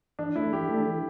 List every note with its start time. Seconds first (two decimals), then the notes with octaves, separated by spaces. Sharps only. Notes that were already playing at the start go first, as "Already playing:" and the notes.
0.19 E3 D4
0.36 A3 D4 E4 A4
0.52 E3 G4
0.69 A3 D4 A4
0.86 E3